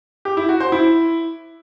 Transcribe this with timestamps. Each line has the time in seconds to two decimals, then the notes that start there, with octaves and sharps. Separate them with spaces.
0.25 G4
0.37 E4
0.49 F#4
0.60 C5
0.72 E4